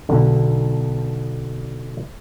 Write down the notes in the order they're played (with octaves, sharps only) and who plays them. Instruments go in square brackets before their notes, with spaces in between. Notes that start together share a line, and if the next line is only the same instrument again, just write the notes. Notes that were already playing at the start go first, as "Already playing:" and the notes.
[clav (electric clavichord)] B1 D3